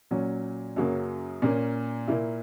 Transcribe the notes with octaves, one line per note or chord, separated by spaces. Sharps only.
A#2 F#3 C#4
F#2 C#3 F#3 A#3
A#2 A#3 C#4
A#2 A#3 E4